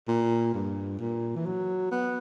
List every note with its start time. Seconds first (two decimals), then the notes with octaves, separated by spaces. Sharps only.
0.08 A#2
0.54 G2
1.00 A#2
1.36 E3
1.46 F#3
1.91 B3